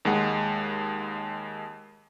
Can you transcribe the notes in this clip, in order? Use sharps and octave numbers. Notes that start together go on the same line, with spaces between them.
D#2 G#3 F#5